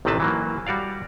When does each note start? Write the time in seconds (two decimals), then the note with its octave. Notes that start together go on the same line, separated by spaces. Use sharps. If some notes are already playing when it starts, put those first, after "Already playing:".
0.05 A1 C3 D#3 C4 B4 A5
0.20 E3 F#3 A#3
0.67 G3 F#4 D5 F5